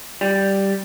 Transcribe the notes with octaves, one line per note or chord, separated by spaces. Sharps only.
G3